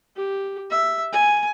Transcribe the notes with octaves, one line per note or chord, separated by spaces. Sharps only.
G4
E5
G#5